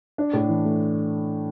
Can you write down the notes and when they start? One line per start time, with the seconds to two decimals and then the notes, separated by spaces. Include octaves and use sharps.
0.18 D4
0.33 A2
0.49 E3
0.65 A3